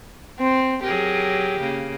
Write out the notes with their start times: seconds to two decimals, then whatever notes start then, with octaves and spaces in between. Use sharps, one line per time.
0.40 C4
0.83 F#3 G4 G#4 A#4
1.59 C#3 A#3